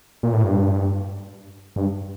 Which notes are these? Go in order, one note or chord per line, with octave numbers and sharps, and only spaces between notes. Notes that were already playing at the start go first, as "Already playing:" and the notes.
A#2
A2
G2
G2